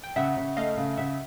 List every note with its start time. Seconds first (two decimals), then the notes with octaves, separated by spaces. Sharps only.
0.04 G5
0.16 C#3 E5 F#5
0.37 C#3
0.57 A3 D#5 F5
0.77 C#3
0.97 C#3 E5 F#5